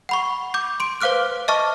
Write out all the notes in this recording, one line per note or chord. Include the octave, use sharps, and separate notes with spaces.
F#5 B5 C#6
D6 G6
C6 D7
B4 C5 F5 D6 F6 F#6
D#5 E5 A5 C#6 D6 F6